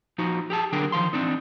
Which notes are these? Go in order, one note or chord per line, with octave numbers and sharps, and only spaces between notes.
F3 D#4 F#4
G4 G#4 A5
D3 F#3 D4 G4 G#4 A#4
D#3 F3 F5 C6
E3 C4 D4 D#4